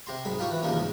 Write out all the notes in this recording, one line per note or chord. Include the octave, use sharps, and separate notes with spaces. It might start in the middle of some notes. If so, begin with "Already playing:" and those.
C3 G4 A#5 C6
B1 G#2 B5
D#4 F4 G4 C5 C#6
E3 B4
E2 C3 D#3 F3 A#3 C#4
G#2